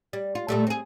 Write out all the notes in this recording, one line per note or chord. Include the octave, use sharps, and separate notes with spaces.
G3
F4
A#2 G3 A3
C4 G#4